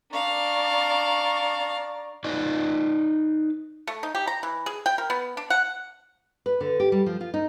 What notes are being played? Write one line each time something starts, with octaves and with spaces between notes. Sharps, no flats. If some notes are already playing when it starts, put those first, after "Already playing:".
D4 D5 F5 A#5 C#6
D#4 B4 D5 D#5
A3
D#4
G4
A#5
E3
G#4
G5
A#4
B3
D4
F#5
B4
D3
G4
G3
F3
F4
D#4